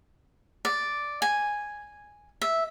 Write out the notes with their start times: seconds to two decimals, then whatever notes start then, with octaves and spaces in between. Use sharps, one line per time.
0.65 D5
1.22 G#5
2.42 E5